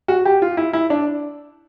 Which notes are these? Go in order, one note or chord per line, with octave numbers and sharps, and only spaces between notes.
F#4
G4
F4
E4
E4
D4